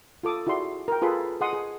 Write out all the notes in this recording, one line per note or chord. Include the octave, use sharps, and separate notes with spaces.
F4 A4 D6 D#6
E4 F#4 G#4 D5 C6
A#4 G5
F4 G#4 A4 B4 B5 C6
G#4 D#5 F#5 C6 D#6
G#4